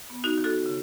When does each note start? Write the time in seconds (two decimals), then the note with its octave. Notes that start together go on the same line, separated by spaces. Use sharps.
0.10 B3
0.24 D#4 F#4
0.38 D#3
0.44 F#4 A4
0.66 C#3